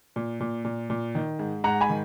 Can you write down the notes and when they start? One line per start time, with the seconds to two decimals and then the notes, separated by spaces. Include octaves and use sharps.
0.16 A#2
0.40 A#2
0.65 A#2
0.90 A#2
1.15 D#3
1.39 G#2
1.64 G#2 F#5 A#5
1.81 G#5 B5
1.90 D#3